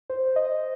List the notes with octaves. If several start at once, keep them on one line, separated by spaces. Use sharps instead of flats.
C5
D#5